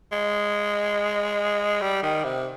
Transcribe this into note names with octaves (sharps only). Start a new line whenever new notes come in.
G#3
G3
D#3
C3